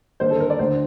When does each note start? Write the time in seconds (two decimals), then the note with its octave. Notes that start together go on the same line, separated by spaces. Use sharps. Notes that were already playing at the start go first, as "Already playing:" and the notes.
0.20 D#2 D3 C5
0.31 A4
0.40 A#4
0.50 D5
0.59 D2 D3 C5